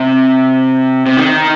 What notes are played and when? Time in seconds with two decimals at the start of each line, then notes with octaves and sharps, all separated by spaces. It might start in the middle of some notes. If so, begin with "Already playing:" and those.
Already playing: C3
1.06 C3
1.17 D#3